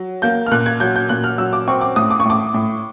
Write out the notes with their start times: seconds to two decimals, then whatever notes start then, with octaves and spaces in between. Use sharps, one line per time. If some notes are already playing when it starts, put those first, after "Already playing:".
Already playing: F#3
0.22 A#3 G6
0.46 F6
0.51 A#2 F#6
0.66 G#6
0.80 F#3 G6
0.96 G6
1.09 A#2 F#6
1.24 F6
1.38 F#3 E6
1.53 D6
1.68 C4 C#6
1.81 D6
1.96 A2 D#6
2.11 D6
2.20 C#6
2.25 A2 D6
2.54 A2